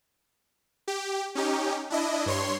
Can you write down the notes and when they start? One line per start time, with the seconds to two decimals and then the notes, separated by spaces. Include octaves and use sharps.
0.88 G4
1.35 C#4 D#4 G4
1.90 D4 E4 D#5
2.26 G2 C#5 C6